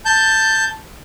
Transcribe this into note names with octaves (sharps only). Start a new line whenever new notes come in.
A5 G6